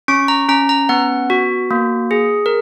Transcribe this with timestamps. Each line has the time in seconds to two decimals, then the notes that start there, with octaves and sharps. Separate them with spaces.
0.08 C#4 C#6
0.28 A#5
0.49 C#4 A#5
0.69 A#5
0.89 B3 F#5
1.30 F#4
1.71 A#3
2.11 G#4
2.46 A#4